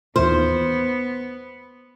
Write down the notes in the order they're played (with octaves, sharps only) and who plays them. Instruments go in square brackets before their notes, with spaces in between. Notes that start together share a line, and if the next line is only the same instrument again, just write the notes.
[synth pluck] D#2 E3 F4 [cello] B3 [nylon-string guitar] C5